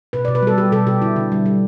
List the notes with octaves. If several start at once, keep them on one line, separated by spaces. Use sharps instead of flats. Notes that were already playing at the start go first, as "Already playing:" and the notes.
B2 B4
B2 D5
B4
G3 A4
G3 G4
B2 A4
B2 G4
D3 E4
D3
G3
G3